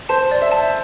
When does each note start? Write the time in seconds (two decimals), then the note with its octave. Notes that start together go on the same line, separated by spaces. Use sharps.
0.09 C5 A5
0.31 D5
0.42 E5
0.52 A5